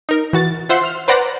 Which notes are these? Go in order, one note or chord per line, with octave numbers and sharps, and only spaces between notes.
D#4 A#4
E3 F#4 A6
F4 C5 E5 F#5 C6
F6
B4 C5 D5 F#5 A#5